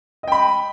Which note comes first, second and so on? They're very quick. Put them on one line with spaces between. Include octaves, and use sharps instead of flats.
D#5 G5 B5